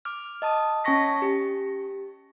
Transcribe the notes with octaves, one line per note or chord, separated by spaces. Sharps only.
D6 F6
D#5 A5 D#6
C#4 G#5 A5 C#6 A#6 B6
G4